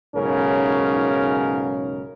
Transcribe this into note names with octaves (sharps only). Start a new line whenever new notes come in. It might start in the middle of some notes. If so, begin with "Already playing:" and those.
B1 G#2 C#3 C#4 A#4